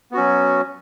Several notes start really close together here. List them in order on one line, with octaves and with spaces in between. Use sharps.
B3 F#4 C#4 F#3